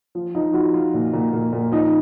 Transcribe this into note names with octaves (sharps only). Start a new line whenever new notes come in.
F3
F3 D#4
F3 F#4
F3 F4
A#2
A#2
A#2
A#2
F3 D#4